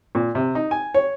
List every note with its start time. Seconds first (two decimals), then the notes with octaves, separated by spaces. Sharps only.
0.15 A#2
0.35 C3
0.55 D#4
0.71 G#5
0.94 C#5